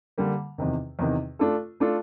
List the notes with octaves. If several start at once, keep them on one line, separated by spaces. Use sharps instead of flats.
D3 G3 A#3
E2 C3 D#3
E2 C3 D#3
A3 D4 F4 A4
A3 D4 F4 A4